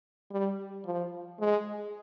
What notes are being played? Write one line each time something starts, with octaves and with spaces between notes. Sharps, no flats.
G3
F3
G#3